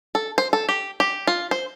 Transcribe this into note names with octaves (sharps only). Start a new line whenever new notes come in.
A4
C5
A4
G4
G4
F4
C5